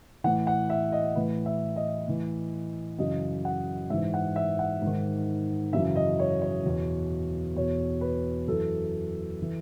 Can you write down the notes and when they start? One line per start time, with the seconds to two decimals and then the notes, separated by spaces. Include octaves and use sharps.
0.24 A2 E3 F#5
0.47 F#5
0.70 E5
0.92 D#5
1.15 A2 E3 B4
1.46 E5
1.76 D#5
2.07 A2 E3
2.98 F#2 C#3 E3 D#5
3.45 F#5
3.90 G#2 E3 E5
4.14 F#5
4.36 E5
4.59 F#5
4.82 G#2 D#3
5.73 F#2 C#3 E3 E5
5.96 D#5
6.19 C#5
6.42 C#5
6.64 E2 B2
7.56 E2 B2 C#5
8.01 B4
8.48 F#2 E3 A4
9.42 E3